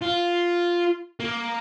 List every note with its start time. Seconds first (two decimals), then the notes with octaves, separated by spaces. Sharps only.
0.02 F4
1.20 A#3